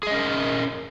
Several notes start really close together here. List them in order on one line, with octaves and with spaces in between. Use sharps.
G#4 D#5 C#4 A#4